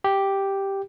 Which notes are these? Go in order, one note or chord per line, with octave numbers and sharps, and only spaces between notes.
G4